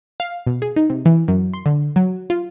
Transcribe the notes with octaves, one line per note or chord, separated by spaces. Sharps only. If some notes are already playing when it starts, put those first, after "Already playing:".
F5
B2
G#4
D#4
C3
E3
F#2
C6
D3
F#3
F4